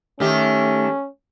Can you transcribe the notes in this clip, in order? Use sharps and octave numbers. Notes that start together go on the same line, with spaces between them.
D#3 A3 C#4 G4